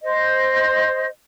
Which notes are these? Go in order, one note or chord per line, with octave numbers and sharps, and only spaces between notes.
C5 D#5